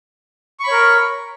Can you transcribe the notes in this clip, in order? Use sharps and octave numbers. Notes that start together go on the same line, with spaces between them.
A#4 C#5 B5 C#6